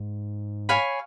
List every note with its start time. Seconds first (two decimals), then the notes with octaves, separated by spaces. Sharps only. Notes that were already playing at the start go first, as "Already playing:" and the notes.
Already playing: G#2
0.69 C#5 F5 G#5 B5